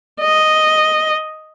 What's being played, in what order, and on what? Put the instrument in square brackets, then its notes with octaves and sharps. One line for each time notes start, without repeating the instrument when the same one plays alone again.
[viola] D#5